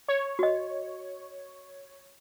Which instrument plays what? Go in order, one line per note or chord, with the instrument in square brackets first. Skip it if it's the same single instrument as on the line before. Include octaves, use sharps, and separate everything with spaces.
[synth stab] C#5
[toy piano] F#4 D#5